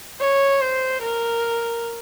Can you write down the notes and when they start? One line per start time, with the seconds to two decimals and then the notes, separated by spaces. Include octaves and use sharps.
0.20 C#5
0.61 C5
1.02 A#4